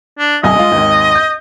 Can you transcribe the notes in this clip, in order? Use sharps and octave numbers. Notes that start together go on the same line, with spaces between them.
D4
D#1 C2 D#5 G#5
G#3 F4
G#1 D#2
G6